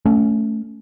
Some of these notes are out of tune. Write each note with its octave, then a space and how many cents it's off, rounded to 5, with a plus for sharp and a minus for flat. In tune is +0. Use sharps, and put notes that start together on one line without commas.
A3 +0 C#4 +15